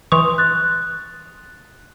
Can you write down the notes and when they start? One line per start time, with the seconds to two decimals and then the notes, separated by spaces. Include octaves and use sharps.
0.12 E3 C6 C#6 D#6 F7
0.38 F#6 A6